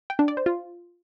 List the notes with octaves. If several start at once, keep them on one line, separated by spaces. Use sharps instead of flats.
G5
D4
D5
C5
F4